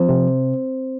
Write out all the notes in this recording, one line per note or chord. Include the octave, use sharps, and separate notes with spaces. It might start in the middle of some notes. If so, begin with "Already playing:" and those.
Already playing: F3 C4 C5
C3